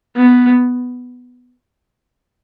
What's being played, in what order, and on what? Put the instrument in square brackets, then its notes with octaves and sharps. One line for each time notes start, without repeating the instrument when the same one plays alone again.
[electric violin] B3